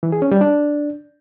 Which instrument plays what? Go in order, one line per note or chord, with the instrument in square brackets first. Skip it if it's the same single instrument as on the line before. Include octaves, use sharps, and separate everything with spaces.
[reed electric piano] E3
G#4
C#4
G3
D4